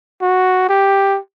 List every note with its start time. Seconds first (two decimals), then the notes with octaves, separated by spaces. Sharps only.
0.21 F#4
0.69 G4